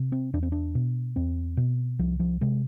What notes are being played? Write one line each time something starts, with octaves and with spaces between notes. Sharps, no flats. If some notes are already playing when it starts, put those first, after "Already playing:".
Already playing: C3
C4
E2 D4
C4
D4
B2
E2 C4
B2
C2 F3
F3
C3 G#3